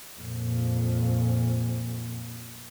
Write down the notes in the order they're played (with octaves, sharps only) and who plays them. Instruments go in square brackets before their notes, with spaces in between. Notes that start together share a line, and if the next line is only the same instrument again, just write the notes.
[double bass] F2 A#2